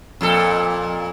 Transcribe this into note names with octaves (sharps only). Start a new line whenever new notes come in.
F2 A#2 A4